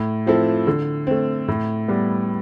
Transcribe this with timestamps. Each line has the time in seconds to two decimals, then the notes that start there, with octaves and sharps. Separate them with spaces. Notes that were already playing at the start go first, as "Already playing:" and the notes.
Already playing: A2
0.26 F3 C4 E4 A4
0.67 D3
1.07 A3 C4
1.48 A2
1.88 G3 B3